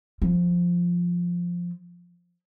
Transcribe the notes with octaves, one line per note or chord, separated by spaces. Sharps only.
F3